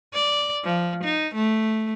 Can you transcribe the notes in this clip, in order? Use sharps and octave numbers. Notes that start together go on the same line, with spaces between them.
D5
F3
D#4
A3